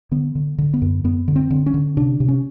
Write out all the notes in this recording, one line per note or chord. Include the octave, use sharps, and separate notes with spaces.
D3 B3
D3
D3
B3
F#2
F#2 B3
D3
C4
D3
C#4
D3
C3 D4
C3
C#4